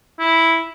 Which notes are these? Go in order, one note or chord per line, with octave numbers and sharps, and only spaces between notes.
E4